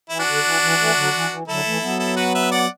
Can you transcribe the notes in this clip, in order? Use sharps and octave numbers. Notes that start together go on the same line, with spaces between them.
E3 E4
D4 F#4
D3
E3
E3
E3 A3
D3 F#3
E3
E3
D3 F#3 E4 A4
E3 A3
F#3 B3
E4 A4
F#4 B4
B4 E5
D5 F#5